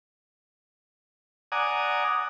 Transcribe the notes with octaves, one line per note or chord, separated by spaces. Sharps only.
D5 F#5 G#5 A#5 D#6